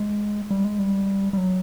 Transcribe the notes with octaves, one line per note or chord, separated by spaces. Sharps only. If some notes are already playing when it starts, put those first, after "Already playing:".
Already playing: G#3
G3
G#3
G3
G3
F#3